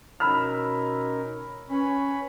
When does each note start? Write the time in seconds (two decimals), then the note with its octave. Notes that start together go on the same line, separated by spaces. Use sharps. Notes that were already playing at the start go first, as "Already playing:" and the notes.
0.20 B2 C#4 D#4 A#4 B5 E6 F6
1.70 C#4 B4 C#5 B5